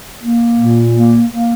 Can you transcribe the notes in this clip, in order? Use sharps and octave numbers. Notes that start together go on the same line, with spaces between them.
A#3
A#2
A#3
A#3